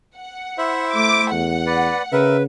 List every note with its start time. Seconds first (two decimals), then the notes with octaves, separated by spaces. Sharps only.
0.17 F#5
0.58 E4 C5 E5
0.93 A3 D6
1.32 E2 F#5
1.66 B4 D5
2.12 C#3 A#4 B4 E5